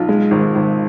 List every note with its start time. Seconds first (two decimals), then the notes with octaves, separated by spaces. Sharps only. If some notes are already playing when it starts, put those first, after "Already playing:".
Already playing: B1 F4
0.09 G#3
0.31 G#1
0.55 G#1